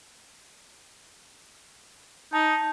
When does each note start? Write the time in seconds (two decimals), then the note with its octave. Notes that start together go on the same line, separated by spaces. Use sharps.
2.33 D#4 A5